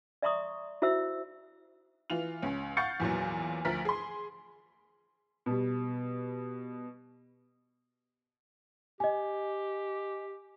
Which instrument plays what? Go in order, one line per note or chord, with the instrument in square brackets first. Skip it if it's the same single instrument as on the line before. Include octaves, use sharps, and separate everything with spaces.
[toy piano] D5 E5 A#5 C6 C#6 D#6
E4 F#4 C5 E5 E6
[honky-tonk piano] E3 F4 F7
C#2 C#4
F5 F#5 C#6 G6 A6 C#7
E2 A#2 E3 F#3
D2 F3 A#4 B6
G#4 C6
[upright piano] B2 G3
[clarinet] G4 [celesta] D#5 G#5